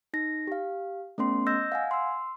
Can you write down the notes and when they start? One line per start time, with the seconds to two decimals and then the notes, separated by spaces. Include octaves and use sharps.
0.13 D#4 A#6
0.47 G4 F5
1.18 A3 B3 C#4 C6
1.47 D#5 E6 G6 A#6
1.72 F5 F#5 G#5
1.91 C6 E6